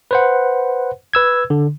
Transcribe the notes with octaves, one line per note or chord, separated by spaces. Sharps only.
B4 C5 F#5
B4 E6 G#6
D3